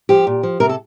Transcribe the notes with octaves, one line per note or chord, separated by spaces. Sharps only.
F3 G4
A#2
F3
C3 A#4
A4